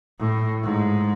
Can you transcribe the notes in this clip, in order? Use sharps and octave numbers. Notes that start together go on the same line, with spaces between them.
A2
G#2